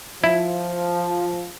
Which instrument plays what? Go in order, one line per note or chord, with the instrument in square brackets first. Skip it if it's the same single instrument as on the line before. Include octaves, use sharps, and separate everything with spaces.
[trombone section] F3 [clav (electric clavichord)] E4